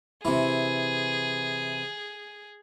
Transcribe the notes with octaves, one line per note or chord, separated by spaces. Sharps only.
C3 E3 G#4